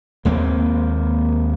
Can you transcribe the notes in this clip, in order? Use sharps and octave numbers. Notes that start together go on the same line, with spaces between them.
D#2 G#3 A#3 C4